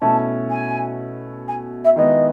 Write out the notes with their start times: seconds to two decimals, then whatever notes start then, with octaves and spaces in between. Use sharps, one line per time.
0.02 B2 A3 C#4 E4 A5
0.50 G#5
1.48 G#5
1.84 E5
1.96 D#3 G#3 B3 E4 D#5